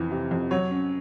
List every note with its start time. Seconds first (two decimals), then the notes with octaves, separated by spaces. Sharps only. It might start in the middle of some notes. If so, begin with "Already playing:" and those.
Already playing: F2 E3
0.11 C3
0.31 F2
0.51 F#3 C#5
0.71 C#4